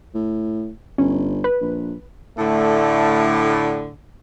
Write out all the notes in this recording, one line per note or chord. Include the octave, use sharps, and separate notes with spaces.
A2
G1 C#4
B4
A#1
A2 D3 A3